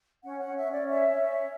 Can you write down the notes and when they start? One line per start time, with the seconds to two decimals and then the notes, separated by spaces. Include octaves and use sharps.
0.24 C#4 F#5
0.39 F#5
0.45 C#4
0.56 E5
0.66 C#4
0.72 D5
0.87 C#5 E5
1.08 C#4
1.29 C#5